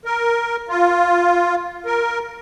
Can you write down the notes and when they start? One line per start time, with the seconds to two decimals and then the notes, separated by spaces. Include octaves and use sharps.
0.05 A#4
0.69 F4
1.86 A#4